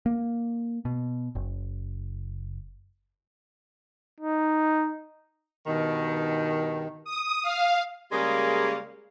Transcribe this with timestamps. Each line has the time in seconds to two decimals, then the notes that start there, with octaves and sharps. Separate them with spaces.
0.06 A#3
0.85 B2
1.35 F#1
4.20 D#4
5.67 G2 B2 D#3
7.05 D#6
7.43 F5
8.12 C#3 G3 G#3 A#3